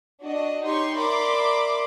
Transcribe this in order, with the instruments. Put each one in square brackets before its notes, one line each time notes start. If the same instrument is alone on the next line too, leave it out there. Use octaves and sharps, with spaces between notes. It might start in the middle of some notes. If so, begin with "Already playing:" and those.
[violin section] D4 F#4 D#5
D#4 G4 C#5 C6 C#6
A#4 D5 E5 B5 C6 D6